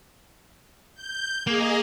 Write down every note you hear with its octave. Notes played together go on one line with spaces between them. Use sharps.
G6
A#3 G#4 D#5